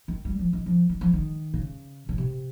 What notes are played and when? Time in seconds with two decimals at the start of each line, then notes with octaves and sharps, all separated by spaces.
0.08 D#3
0.25 G3
0.39 F3
0.53 D#3
0.66 F3
0.89 D#3
1.01 F3
1.13 D#3
1.54 C#3
2.09 C#3
2.18 C3